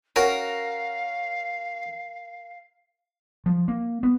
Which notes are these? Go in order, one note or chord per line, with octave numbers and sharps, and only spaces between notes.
C#4 F#4 A#4 F5
F3
A#3
B3